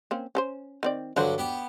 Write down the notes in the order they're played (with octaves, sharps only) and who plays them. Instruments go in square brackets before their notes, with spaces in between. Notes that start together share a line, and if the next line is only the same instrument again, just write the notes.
[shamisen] A#3 C4 C#4
C#4 A4 C5
D#3 C4 D5
[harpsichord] G2 D3 F#3 [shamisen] D4 F#4 C5
[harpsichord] B3 G4 G5